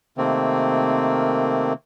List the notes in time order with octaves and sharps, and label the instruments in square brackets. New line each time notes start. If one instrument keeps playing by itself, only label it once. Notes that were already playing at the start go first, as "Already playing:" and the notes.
[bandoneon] C3 D#3 A3 A#3 C4